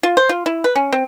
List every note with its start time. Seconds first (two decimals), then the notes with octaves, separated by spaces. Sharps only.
0.03 F4
0.17 C5
0.29 F4
0.46 E4
0.64 B4
0.76 C#4
0.92 C4